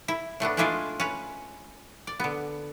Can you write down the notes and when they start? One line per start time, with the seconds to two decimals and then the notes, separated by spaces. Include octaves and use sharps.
0.08 E4
0.40 A2 A3 B3 D4
0.57 G#3 A3 D4 E4 F4 G#4
1.00 C#4 B4
2.07 D5
2.20 D3 B3